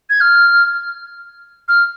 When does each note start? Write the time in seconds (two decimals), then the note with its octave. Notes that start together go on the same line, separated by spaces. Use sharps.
0.10 G#6
0.21 F6
1.68 F6